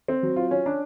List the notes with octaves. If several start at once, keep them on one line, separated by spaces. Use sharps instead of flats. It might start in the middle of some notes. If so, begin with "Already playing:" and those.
C4
F#3
F4
C#4
D4